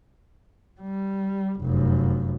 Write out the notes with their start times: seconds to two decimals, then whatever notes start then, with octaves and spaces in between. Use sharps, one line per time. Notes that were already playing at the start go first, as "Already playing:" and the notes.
0.81 G3
1.61 F1 F#2